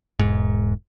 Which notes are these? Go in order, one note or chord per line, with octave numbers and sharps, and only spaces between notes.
E1 G#2